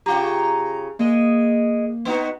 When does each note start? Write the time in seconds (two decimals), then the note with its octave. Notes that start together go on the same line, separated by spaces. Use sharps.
0.06 C#3 F4 G4 A#5
0.99 G#3 A#3 D#5
2.05 B3 D#4 F#4